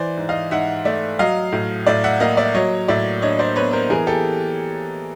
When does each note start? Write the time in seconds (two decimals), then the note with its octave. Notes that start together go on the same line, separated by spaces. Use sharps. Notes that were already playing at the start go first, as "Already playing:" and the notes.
Already playing: E3 C5 D5
0.17 G#2
0.29 D#5 F5
0.51 G#2 E5 F#5
0.85 A3 D5 E5
1.19 F#3 D#5 F5
1.52 A2
1.86 A2 D5 E5
2.04 E5 F#5
2.20 A#3 D#5 F5
2.37 D5 E5
2.55 F#3 C#5 D#5
2.88 A2 D5 E5
3.22 D4 C#5 D#5
3.39 C5 D5
3.56 B3 B4 C#5
3.73 A#4 C5
3.90 E3 G#4 A#4
4.07 G4 A4